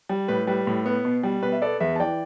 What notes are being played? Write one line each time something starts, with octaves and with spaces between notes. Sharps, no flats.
G3
A2 B4
G3 B4
A2
B3
B2
G3
B2 B4
E5
B3 A4 D5
E2 B4 E5
A5
E3 D5 G5